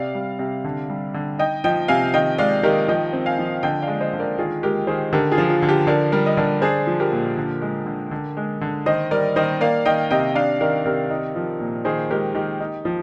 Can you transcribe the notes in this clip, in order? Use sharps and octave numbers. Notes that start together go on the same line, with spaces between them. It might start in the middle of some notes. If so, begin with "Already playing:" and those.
Already playing: C3 D5 F5
G3
C3
D3
G3
D3
D#4 D#5 G5
F3 D#5 G5
C3 F5 G#5
D#3 D#5 G5
G#3 D5 F5
D#3 G4 A#4
F3 D#5 G5
C4
F5 G#5
F3
D3 D#5 G5
D5 F5
G#3
C5 D#5
D3
A#4 D5
D#3 F4 G#4
G#3 G4 A#4
D#3 G#4 C5
D3 G4 A#4
F4 G#4
F3
F4
D3
G4
D3 A#4 D5
G3 A#4 D5
D#5
D3 A#4 D5
D4 G#4 C5
F3
G4 A#4
A#2
D3
G#3
D3
D3
G#3
D3
D#3 C5 D#5
G3 A#4 D5
D#3 C5 D#5
A#3 D5 F5
D#3 D#5 G5
C3 D#5 G5
D4 D5 F5
D#3 A#4 D5
C3 A#4 D5
D#4
F3
A#2
D#3 G#4 C5
G#3 G4 A#4
D#3 G4
D#4
F3